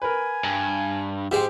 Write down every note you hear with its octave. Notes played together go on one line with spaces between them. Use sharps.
A#4 B4 G#5
G2
G#2 G#3 G4 C5 G5